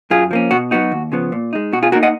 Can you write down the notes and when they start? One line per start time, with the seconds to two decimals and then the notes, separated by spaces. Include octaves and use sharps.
0.10 F#2 F4 G#4
0.31 F3 A#3 C#4
0.51 B2 F#4
0.71 F#3 B3 D#4 F#4
0.92 D#2
1.12 C#3 F3 B3
1.32 A#2
1.53 G#3 D#4
1.73 B2 F#4
1.83 F4 G#4
1.92 A#3 D#4 F#4 A#4
2.03 D#5 F#5